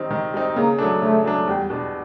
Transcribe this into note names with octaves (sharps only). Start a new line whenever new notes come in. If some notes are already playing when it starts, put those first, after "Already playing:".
Already playing: D#3 G3 C4 D#4
D#3
G3 C4 D#4
C#3 A#3
F#3 A3 D4
C#3 A3
F#3 A3 D4
E2 G3
B2 G3 B3 D4